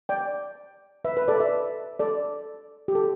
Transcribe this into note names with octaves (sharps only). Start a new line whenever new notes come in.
D5 G5
B4 E5
B4
A4 D5
B4 E5
A4 D5
G4
A4